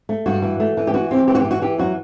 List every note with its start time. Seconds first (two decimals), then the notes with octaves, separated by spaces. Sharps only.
0.09 A3
0.26 G2 F#4
0.42 E3
0.60 A3
0.77 E3
0.87 G4
0.94 E3 F#4
1.11 C4 G4
1.27 E3 G4
1.35 F#4
1.40 G4
1.45 E3
1.51 F#4
1.62 E3 G4
1.78 F#2 F#4